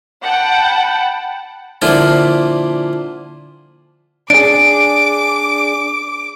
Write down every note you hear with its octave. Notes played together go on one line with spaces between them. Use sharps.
F#5 G5 A5 B5
A#2 D3 F3 E4 F4
D4 G#4 D6 D7